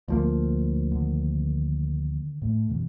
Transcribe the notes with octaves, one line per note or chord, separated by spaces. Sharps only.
D2 F3 A#3
D3 D#3
A2 A3
F#2 B2 E3